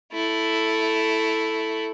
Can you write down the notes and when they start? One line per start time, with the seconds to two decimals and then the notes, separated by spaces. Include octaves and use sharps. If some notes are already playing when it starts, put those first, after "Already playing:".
0.13 A3 E4